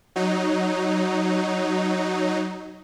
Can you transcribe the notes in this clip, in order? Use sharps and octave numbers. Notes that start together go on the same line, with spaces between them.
F#3 D#4